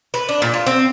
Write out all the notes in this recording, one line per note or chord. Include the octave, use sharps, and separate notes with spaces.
B4
D4
A#2
F4
C4